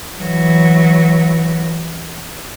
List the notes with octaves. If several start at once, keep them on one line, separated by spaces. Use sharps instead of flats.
E3 F#3